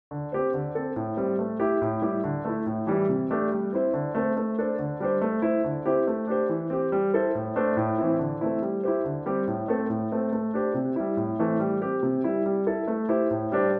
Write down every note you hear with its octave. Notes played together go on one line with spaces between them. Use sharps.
D3
C4 G4 C5
D3
C4 A4
A2
G3 C4
A3
E4 G4
A2
G3 E4 G4
D3
A3 E4
A2
E3 G3 E4
C3
A3 D4 G4
G3
C4 E4 C5
D3
A3 C4 A4 C5
A3
D4 A4 C5
D3
G3 D4 G4 C5
A3
E4 C5
D3
C4 E4 G4 C5
A3
D4 G4 C5
E3
C4 G4
G3
E4 A4 C5
A2
A3 D4 C5
A2
E3 C4 E4
D3
A3 C4 E4
G3
E4 G4 C5
D3
G3 C4 G4
A2
A3 C4 A4 C5
A2
A3 C4
A3
D4 G4 C5
C3
G3 E4
A2
E3 A3 C4
G3
C4 G4
C3
G3 E4
G3
E4 A4
A3
E4 G4 C5
A2
G3 D4 G4 C5